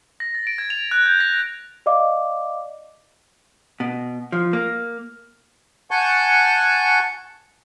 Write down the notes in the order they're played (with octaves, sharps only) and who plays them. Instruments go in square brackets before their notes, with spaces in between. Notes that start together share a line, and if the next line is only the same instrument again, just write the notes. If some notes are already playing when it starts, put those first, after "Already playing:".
[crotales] A#6
A6
D7
G#6
F7
F#6
G6
A#6
[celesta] D5 D#5 F5 D6
[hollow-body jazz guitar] B2
F3
A#3
[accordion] F#5 G#5 A5 C#6 G6